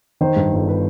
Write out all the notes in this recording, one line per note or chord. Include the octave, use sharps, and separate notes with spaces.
D#3 C5
G2
G1
B4